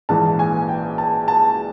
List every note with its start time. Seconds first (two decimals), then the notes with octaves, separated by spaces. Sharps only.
0.09 A#1 G#2 E3 A5
0.39 G#5
0.69 G5
0.98 A5
1.28 A5